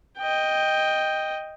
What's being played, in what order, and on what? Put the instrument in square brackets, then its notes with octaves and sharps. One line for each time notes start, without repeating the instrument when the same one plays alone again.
[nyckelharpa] D#5 G5